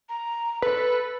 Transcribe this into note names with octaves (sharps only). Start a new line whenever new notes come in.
A#5
A4 B4